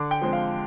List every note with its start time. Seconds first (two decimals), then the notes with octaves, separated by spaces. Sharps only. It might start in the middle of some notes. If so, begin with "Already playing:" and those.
Already playing: D3 D6
0.11 G5
0.22 F3 G#3 C4
0.33 F5